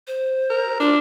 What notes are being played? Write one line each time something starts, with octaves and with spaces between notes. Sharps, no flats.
C5
A#4
D4 F4